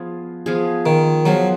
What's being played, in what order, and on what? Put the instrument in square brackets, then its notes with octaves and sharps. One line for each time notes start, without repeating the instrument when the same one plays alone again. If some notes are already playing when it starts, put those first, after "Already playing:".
Already playing: [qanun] F3 B3 F4 G#4
F3 B3 F4 G#4
[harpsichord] D#3
[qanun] F3 B3 F4 G#4 [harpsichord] F#3